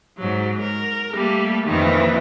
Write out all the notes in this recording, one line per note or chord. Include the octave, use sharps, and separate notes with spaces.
G#2 F#3
A#4
G3 A3 A#3
F2 A#2 D#3 E3